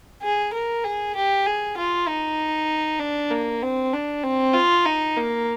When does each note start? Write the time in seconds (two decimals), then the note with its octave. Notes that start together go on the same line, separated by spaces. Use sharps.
0.22 G#4
0.53 A#4
0.84 G#4
1.16 G4
1.46 G#4
1.77 F4
2.07 D#4
3.00 D4
3.30 A#3
3.62 C4
3.93 D4
4.23 C4
4.54 F4
4.86 D#4
5.17 A#3